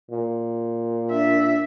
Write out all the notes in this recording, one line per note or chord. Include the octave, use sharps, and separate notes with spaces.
A#2
D4 E5